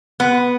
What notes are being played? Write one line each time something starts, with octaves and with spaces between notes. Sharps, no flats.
B3